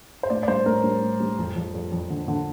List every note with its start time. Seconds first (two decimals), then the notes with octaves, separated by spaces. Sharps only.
0.23 C5
0.30 A2 D5
0.43 D5
0.48 G3 C5
0.66 A2 A#4
0.84 G3
1.02 A2
1.20 G3
1.39 F2
1.56 F2
1.74 F2
1.92 F2
2.10 D3
2.28 D3